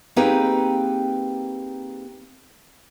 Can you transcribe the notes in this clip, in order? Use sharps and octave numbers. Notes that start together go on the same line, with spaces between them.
A#3 C4 D#4 G4 G#4 B4